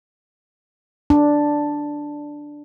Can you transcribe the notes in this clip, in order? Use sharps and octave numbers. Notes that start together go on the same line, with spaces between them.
D4